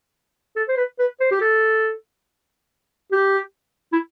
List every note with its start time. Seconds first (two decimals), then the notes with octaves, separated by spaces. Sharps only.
0.56 A4
0.68 C5
0.77 B4
0.99 B4
1.20 C5
1.31 G4
1.41 A4
3.12 G4
3.92 E4